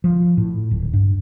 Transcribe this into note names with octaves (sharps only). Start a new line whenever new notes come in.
F3
A2
D1
G2